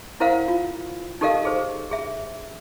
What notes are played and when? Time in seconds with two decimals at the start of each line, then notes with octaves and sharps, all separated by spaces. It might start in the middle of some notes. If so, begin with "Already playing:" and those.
0.20 E4 A#4 C5 F5 F#5
0.48 F4
1.21 D#4 G4 A4 A#4 D#5 F5
1.45 G#4 C5
1.91 G#4 E5